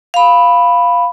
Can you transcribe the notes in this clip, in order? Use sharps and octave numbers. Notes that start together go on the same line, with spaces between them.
F5 B5